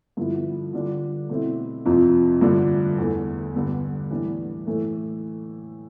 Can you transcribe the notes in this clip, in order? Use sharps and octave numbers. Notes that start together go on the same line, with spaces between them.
G2 D3 F3 B3 E4
D3 G3 D4 F4
B2 A3 C4 E4
F2 C3 F3 C4 F4
G2 D3 F3 A3 D4
E2 D3 A3
G2 D3 G3 B3
A2 E3 G3 B3 D4
A2 E3 A3